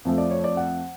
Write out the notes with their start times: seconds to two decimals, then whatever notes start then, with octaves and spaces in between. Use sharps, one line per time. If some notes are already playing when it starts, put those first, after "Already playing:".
0.05 F2 F3 A3
0.18 D5
0.31 C#5
0.44 D5
0.57 F#5